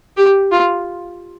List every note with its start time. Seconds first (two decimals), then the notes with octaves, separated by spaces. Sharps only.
0.17 G4
0.51 F4